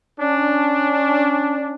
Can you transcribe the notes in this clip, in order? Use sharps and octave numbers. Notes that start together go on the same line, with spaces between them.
C#4 D4